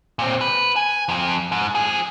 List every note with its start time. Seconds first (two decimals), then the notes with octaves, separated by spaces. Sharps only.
0.19 A#2 C4
0.41 B4
0.76 G#5
1.09 F2
1.52 G#2
1.75 F3 G#4